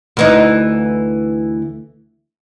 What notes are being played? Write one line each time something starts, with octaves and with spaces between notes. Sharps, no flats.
D2 E3 D#4